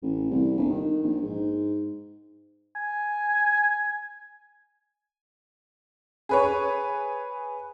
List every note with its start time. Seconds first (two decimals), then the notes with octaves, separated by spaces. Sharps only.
0.02 A1
0.30 C2
0.58 G1
0.69 D#3
1.03 A#1
1.22 G#2
2.76 G#5
6.29 G#4 B4 C#5